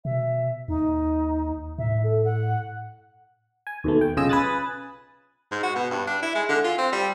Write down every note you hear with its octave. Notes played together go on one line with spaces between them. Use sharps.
B2 E5
D#2 D#4
A2 E5
A4
F#5
G#5
D#2 B2 A3
G5
B1 C#3 F4 D#5 G#5 E6
B4 G#5 D#6 F#6 A6
G#2
F#4
B2
G2
D4
E4
G#3
D3
F4
C4
G3